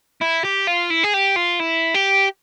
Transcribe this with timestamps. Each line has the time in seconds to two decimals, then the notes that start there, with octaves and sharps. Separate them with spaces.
0.22 E4
0.45 G4
0.67 F4
0.90 E4
1.04 G#4
1.14 G4
1.36 F4
1.60 E4
1.94 G4